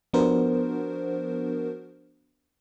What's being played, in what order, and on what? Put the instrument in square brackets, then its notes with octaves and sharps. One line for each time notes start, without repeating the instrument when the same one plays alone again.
[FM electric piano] F3 B3 D4 F#4 A#4 C5